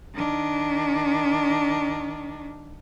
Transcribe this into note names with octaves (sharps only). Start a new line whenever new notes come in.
D#3 D4